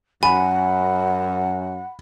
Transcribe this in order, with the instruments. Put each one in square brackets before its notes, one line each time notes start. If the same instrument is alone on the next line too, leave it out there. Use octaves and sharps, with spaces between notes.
[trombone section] F#2 [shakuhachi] F#5 [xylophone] G#5 [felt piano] B5